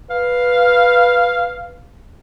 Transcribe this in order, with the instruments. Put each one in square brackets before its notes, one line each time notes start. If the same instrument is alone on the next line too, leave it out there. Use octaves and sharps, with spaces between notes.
[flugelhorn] B4 [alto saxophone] F5